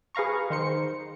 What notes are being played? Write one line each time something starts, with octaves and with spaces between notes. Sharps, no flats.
G#4 B4 F5 A#5 C#6
D#3 C5 C#7